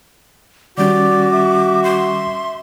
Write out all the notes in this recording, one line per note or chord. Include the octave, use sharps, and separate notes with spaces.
D#3 G3 C#4 F#4 D5 D6
E5
C6